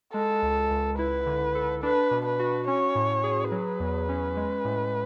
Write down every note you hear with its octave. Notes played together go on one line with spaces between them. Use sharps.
G#3 A4
C#2
C#2
E4 B4
D3
A4
D4 B4
B2
B4
F#4
C#4 C#5
A2
G#4
F#3 B4
E2
C#4
G#3
A2